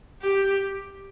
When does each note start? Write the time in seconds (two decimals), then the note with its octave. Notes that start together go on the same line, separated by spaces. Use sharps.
0.21 G4